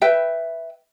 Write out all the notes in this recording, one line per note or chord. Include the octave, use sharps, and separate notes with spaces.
B4 E5 G5